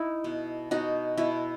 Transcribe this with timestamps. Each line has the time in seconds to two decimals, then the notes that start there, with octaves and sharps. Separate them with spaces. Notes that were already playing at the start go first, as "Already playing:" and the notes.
Already playing: D#4 E4
0.24 B2
0.71 B2 D#4 F#4
1.17 B2 E4